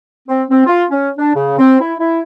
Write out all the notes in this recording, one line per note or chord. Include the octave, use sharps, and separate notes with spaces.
C4
C4
F4
C#4
D4
C#3
C4
E4
E4